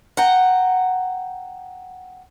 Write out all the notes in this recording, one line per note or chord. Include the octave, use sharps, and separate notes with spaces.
F#5 G5 A#5